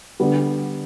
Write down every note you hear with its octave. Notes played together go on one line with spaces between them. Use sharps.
D3 G3 B3